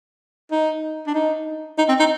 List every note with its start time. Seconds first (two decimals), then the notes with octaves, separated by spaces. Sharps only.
0.51 D#4
1.07 D4
1.14 D#4
1.78 D#4
1.88 C4
1.99 D#4